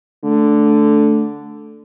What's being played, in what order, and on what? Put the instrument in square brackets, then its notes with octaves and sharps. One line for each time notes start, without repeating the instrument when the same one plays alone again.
[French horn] D3 [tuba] A3